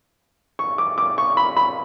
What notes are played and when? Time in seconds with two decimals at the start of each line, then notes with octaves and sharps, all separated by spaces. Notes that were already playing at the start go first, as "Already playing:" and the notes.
0.59 C#6
0.78 D6
0.98 D6
1.18 C#6
1.37 B5
1.57 B5